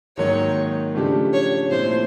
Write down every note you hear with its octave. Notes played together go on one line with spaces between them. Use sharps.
G#2 D#3 F#3 A#3 D#4 C#5
C#3 F3 A3 D4 G4
C#5
A#2 F3 A3 C4 E4 C5